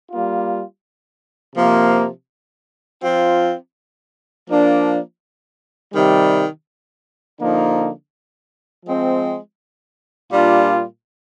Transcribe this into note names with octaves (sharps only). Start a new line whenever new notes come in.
G3 A#3 F4
C3 F3 A#3
F3 C4 F4
F3 A#3 D4
C3 D#3 G3
D3 F3 A#3 D#4
F3 G#3 C4
A#2 G3 D4 F4